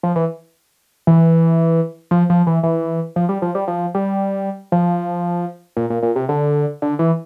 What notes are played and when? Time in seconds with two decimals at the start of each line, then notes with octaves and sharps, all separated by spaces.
0.03 F3
0.16 E3
1.07 E3
2.11 F3
2.30 F3
2.47 E3
2.63 E3
3.16 F3
3.29 G3
3.42 F3
3.55 G3
3.68 F3
3.95 G3
4.72 F3
5.77 A#2
5.90 A#2
6.03 A#2
6.16 C3
6.29 D3
6.82 D3
6.99 E3